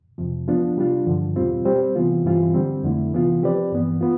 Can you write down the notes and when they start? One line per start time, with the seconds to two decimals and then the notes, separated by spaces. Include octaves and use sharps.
0.18 F2 C3 F3
0.48 F3 B3 D4 F4
0.77 C3 G3 D4 F4
1.07 G2 D3 F3
1.36 E2 B2 G3 C4 F4
1.65 G3 C4 G4 C5
1.95 C3 E3 B3 F4
2.24 G2 E3 G3 C4 F4
2.54 D3 G3 C4
2.83 F2 D3 A3 E4
3.13 C3 E3 B3 F4
3.42 F3 C4 G4 B4 D5
3.72 G2 E3 B3
4.01 B3 F4